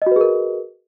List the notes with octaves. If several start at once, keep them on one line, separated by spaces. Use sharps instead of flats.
F#4 G#4 A#4 B4 D#5